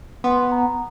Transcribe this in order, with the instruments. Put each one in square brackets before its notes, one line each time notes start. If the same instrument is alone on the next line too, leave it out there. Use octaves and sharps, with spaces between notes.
[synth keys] B3 [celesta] C6
[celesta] A#5